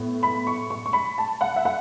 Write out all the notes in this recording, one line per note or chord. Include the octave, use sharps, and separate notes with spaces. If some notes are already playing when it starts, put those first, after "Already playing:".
Already playing: A2 B3
B5
C#6
C#6
C#6
B5
A5
F#5
E5
F#5